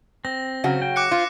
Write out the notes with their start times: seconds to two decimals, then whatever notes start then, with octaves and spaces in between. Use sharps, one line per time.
0.25 C4 A#6
0.64 C#3 F#3 F#4
0.82 G5
0.96 D6 F#6 C#7
1.12 F4 C5